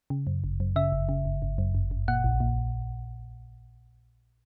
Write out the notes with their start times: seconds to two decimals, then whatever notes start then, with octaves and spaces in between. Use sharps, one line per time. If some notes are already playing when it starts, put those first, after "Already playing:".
0.10 C#3
0.27 F#2
0.44 G1
0.60 F#2
0.76 C#3 E5
0.92 G1
1.09 C#3
1.25 G1
1.42 G1
1.58 F#2
1.75 G1
1.91 G1
2.08 A#2 F#5
2.24 A#1
2.40 A#2